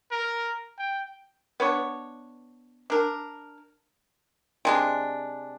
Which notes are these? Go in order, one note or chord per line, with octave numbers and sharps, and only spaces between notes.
A#4
G5
B3 D4 C#5
D4 A#4
C3 G#3 D4